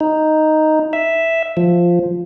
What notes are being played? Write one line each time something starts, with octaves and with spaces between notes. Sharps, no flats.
D#4
E5
F3